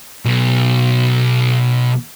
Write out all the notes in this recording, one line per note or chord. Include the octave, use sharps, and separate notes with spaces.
B1 B2